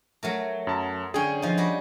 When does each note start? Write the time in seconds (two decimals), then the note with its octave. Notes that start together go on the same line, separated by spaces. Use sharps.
0.23 F#3 A3 A#4
0.67 F#2 A5 A#5
1.14 D3 C#4 G#4 G5
1.42 F3 D#4
1.58 G3 F#4